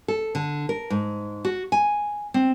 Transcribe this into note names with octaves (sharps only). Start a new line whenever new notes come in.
A4
D3
A#4
G#2
F#4
G#5
C4